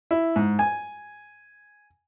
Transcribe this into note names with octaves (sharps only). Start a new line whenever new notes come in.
E4
G#2
G#5